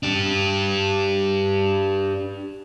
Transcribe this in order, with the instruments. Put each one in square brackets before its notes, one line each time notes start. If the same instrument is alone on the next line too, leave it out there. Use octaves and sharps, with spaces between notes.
[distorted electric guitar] D4 G4